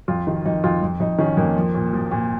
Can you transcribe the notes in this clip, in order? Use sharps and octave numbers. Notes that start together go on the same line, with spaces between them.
F2 F4
D#3
F2 D#4
F2 F4
F2
F2 D#4
D#3 C#4
F2 A#3
F3
A#2
F3
A#2